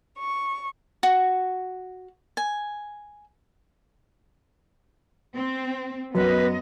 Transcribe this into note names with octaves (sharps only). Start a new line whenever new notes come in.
C#6
F#4
G#5
C4
F#2 B3 B4 D#5